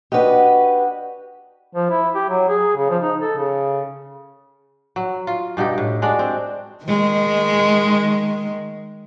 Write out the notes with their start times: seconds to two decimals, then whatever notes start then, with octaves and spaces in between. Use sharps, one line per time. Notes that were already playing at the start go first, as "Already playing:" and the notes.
0.12 D4 F#4 G4 B4 D#5
1.74 F3
1.91 E4
2.15 G4
2.29 F#3
2.49 G#4
2.76 C#3
2.90 F3
3.02 D#4
3.21 A4
3.37 C#3
4.96 F#3
5.27 F4
5.57 G2 B2 D#4 G4
5.78 A2
6.02 G#3 D4 F#4 D5
6.19 C4
6.84 D#3 G#3